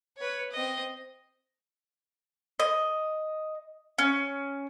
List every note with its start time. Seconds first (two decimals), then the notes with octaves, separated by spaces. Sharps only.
0.17 B4 C#5
0.52 C4 D#5
2.60 D#5
3.98 C#4